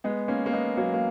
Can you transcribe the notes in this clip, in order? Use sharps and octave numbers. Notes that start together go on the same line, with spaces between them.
G#3 B3
A#3 C#4
A#3
G#3 B3
F#3 A#3
A#3